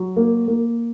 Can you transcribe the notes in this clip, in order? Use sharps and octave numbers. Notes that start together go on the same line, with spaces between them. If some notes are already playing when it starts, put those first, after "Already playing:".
Already playing: F#3
A#3
A#3